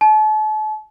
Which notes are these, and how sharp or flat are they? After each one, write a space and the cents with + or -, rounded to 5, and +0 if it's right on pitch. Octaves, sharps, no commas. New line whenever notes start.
A5 -40